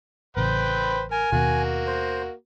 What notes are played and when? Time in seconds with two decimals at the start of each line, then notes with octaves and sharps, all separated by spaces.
0.37 A1 C#3 B4 C5 G5
1.12 A#4 G#5
1.32 D#2 B2 D#3 A#3 F#4
1.87 C5